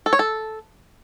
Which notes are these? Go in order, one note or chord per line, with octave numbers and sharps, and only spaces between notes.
A4
C#5
A4